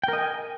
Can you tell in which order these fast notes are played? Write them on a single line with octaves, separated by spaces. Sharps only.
G5 A#4 D#5 G#5